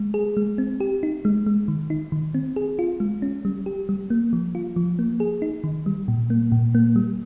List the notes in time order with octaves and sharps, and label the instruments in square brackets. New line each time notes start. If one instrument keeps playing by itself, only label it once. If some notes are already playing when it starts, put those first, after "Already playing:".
Already playing: [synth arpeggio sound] G#3
G#4
G#3
C4
G4
D#4
G#3
G#3
D#3
D#4
D#3
C4
G#4
F4
G#3
C#4
G3
G4
G3
A#3
F3
F4
F3
A#3
G#4
D#4
D#3
G3
A#2
A#3
A#2
A#3
G3